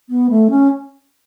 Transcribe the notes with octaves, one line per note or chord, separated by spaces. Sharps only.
B3
A3
C#4